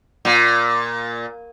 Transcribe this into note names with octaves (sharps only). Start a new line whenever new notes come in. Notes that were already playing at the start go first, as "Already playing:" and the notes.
A#2